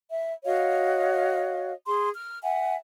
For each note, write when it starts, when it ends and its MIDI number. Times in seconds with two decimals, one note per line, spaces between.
0.10 0.33 76
0.44 1.72 66
0.44 1.72 73
0.44 1.72 75
0.44 1.72 77
1.86 2.09 68
1.86 2.09 84
2.14 2.38 89
2.42 2.74 76
2.42 2.74 78
2.42 2.74 80